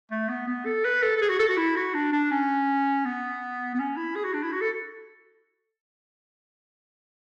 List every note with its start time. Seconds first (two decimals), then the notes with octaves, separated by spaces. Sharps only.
0.11 A3
0.28 B3
0.47 B3
0.65 A4
0.85 B4
1.02 A4
1.17 A4
1.21 G#4
1.30 F#4
1.39 A4
1.49 F#4
1.57 E4
1.76 F#4
1.94 D4
2.12 D4
2.31 C#4
3.05 B3
3.74 B3
3.79 C#4
3.97 E4
4.15 G#4
4.24 F#4
4.34 D4
4.43 E4
4.52 F#4
4.61 A4